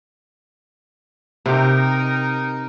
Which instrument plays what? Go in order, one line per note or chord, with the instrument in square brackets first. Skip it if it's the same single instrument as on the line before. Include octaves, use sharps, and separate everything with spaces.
[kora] C3 G4 [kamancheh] D#4 A#4